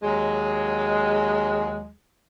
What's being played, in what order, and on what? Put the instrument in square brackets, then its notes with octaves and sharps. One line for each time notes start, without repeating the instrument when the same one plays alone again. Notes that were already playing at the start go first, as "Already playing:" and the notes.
[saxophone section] D#2 F#3 G#3